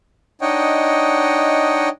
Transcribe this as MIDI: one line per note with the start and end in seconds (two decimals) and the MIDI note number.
0.41 1.89 62
0.41 1.89 63
0.41 1.89 73
0.41 1.89 75
0.41 1.89 78
0.41 1.89 79